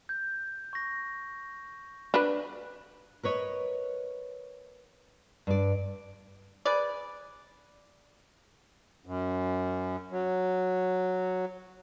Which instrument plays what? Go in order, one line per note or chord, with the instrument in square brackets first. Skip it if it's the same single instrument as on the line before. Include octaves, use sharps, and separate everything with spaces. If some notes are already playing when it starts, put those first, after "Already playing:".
[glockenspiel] G6
C#6 A#6
[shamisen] D4 B4
[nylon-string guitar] A#4 B4 C#5 D#5
G2 D5
[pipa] G#4 B4 D5
[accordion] F#2
F#3